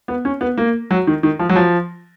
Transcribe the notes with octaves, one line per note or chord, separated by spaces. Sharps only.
B3
C#4
B3
A#3
F#3
D#3
D#3
F3
F#3
F3